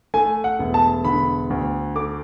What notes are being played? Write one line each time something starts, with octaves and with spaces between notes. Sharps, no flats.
A3 G#5
F#5
E1
A5
D3 B5
D2
A3 D6